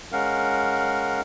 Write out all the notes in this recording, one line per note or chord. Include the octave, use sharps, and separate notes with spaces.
G#3 C#4 A#4 F5 F#5